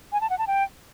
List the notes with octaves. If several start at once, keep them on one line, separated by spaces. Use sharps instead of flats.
G#5
A5
F#5
A5
G5